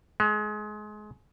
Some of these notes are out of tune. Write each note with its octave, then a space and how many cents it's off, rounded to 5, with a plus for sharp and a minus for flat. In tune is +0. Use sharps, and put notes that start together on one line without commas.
G#3 +25